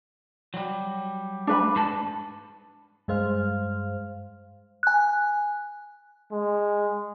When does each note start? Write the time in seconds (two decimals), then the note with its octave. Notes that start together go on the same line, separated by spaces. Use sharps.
0.54 F#3 G3
1.47 D4 B4 B5
1.76 G#2 B4 A5
3.08 G2 G#3 C5 F5 F6
4.83 G#5 F#6
6.32 G#3